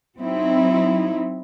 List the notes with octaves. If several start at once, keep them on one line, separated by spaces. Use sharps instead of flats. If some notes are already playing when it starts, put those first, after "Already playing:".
F#3 C4 D#4 E4